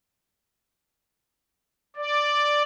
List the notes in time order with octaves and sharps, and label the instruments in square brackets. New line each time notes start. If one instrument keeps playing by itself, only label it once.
[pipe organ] D5